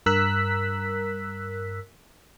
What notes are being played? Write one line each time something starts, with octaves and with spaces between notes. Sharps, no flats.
G2 A#4 E6 F#6 B6